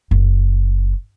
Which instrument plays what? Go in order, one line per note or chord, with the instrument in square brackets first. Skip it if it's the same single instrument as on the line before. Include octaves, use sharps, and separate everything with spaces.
[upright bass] F#1